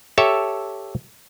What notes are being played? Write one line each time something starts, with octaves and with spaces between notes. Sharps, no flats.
G4 A4 C#5 E5 A5